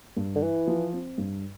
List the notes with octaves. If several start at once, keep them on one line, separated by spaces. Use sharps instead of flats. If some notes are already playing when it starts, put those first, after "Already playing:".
G2
D3
E3 E4
F3
C4
G2